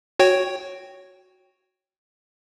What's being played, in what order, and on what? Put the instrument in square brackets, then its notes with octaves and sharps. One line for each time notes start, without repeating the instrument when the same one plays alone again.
[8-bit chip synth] F#4 C#5 G5